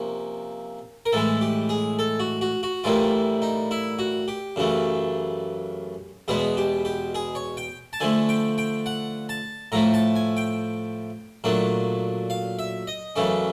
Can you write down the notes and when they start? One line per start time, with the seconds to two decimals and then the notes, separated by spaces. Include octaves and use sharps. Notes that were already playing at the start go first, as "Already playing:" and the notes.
Already playing: C3 F3 A#3 C#4
1.06 A#4
1.13 A2 E3 G#3 A4
1.41 G4
1.69 G#4
1.99 A4
2.20 F#4
2.41 F#4
2.63 F#4
2.84 A2 E3 G3 A#3 F4
3.42 D#4
3.71 E4
3.99 F#4
4.28 G4
4.56 F#2 C#3 E3 A3
6.28 E2 B2 G#3 B3 G#4
6.57 G4
6.85 G4
7.15 G#4
7.35 C#5
7.57 G5
7.93 A5
8.00 D3 F3 A3 G#5
8.29 G5
8.58 G5
8.86 F#5
9.29 A5
9.72 A2 F3 A3 A#5
9.94 A5
10.16 G#5
10.37 G5
11.44 A#2 F#3 A3 D4
12.30 F5
12.59 E5
12.87 D#5
13.16 F#2 C#3 E3 A3 C#4